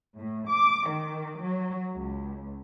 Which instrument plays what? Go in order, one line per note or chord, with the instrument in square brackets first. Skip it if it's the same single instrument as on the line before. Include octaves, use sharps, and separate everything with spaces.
[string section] A2
D6
D#3
F#3
C#2